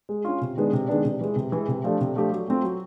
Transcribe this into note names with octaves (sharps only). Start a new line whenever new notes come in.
G#3
C#4 F4
C3
D#3 G#3 B3 D4
C3
D#3 G#3 B3 D4
C3
E3 G#3
C3
E3 G#3
C3
F3 A3 D4 G4
C3
F3 A3 D4 G4
F#3
A3 C4 F4
F#3